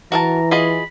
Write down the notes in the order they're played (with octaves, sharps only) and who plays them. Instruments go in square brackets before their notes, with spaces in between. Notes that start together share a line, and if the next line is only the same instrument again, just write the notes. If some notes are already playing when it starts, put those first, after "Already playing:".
[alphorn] E3 [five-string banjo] F#4 A#4 A5 [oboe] A#5
[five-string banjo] F4 G#4 D#5 [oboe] B5